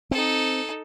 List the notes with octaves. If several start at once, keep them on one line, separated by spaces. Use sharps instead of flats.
C4 D#4 A4